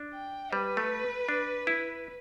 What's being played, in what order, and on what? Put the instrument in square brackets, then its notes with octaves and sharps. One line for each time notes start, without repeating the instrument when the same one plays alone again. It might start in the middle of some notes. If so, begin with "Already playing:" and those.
Already playing: [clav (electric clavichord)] D4
[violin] G5
[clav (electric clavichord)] G3 [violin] B4
[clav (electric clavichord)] A3
D4
E4